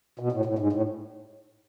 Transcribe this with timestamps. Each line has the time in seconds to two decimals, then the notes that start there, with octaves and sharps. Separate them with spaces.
0.19 B2
0.32 A2
0.45 A2
0.59 G#2
0.73 A2